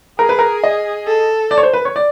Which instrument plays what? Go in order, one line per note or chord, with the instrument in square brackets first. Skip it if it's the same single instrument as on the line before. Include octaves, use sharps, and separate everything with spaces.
[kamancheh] G#4 [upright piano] A#4
[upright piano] B4
A#4
D#5
[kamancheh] A4
[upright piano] D5
C#5
C5
B4
C#5
D5